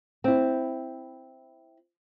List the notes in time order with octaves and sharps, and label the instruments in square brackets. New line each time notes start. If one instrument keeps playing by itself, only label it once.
[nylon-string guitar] C4 E4